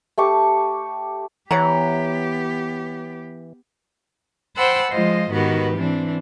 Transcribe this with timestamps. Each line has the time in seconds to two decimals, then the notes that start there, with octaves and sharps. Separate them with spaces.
0.18 A3 G4 C#6 D6
1.51 E3 B3 G4 C#5 F#5 A#5
4.56 C5 F#5 G5 A5 B5 E6
4.92 F3 G#3 F4 C5 D#5
5.31 G#2 D#3 B3 F#4 G4 B4
5.76 E3 C4 D4